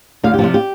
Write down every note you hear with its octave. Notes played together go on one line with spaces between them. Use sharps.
D2 F5
G4
C3 F3 F4
G4